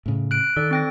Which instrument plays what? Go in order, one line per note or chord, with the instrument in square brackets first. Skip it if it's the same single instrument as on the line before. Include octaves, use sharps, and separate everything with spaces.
[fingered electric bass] A2 C#3
[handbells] F#6 D7
[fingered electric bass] D#3 [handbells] A4 D5
[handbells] C4 G5 A#6